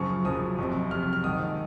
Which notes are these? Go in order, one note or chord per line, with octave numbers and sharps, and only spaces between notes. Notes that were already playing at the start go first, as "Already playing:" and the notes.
Already playing: F#1 F#2 C#3 F3 C#6
F#1 F#2 C#3 F3 D#6
F#1 F2 C3
F#1 F2 C3 F6
F6
F6
A#1 G#2 D#3 D#6